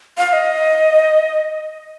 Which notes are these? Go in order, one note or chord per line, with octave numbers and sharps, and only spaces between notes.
F5
F5
D#5